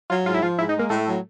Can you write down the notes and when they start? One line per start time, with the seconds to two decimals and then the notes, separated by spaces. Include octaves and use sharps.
0.09 F#3 F4
0.25 G#2 F4
0.34 E4
0.42 F3 F4
0.57 G#2 E4
0.69 D#4
0.74 G#3
0.79 A#3
0.90 A2 A3
1.06 F#3